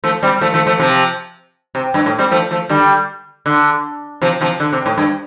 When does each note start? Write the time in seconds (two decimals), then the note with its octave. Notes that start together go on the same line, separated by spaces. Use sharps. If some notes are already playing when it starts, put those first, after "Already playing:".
0.04 F3 A3
0.23 G3 C4
0.41 F3 A3
0.54 F3 A3
0.67 F3 A3
0.79 C3 F3
1.75 C3
1.94 G2
2.06 A2
2.19 G3 C4
2.31 F3 A3
2.51 F3 A3
2.69 D3 G3
3.46 D3
4.22 C3 F3
4.41 C3 F3
4.60 D3
4.72 C3
4.86 A2
4.98 G2